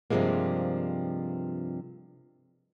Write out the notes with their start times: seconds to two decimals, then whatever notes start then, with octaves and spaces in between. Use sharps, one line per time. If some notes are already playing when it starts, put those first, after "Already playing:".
0.10 G2 C3 E3 F3 G#3 A#3